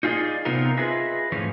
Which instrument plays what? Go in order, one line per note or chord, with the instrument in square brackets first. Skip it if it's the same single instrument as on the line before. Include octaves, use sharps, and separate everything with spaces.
[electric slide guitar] D#4 F4 G#4 A4 D5 D#5
C3 B3 C4 D#4 F4 A#4
F4 G#4 B4 D#5 E5
G#2 E3 F3 A3 C#4